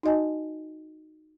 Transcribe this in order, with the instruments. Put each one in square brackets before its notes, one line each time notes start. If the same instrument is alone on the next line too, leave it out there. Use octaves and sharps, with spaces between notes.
[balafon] D#4 F#4 D#5 G#5 A5